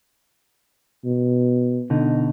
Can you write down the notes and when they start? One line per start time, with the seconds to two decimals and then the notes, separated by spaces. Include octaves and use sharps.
1.05 B2
1.90 B2 D3 D#4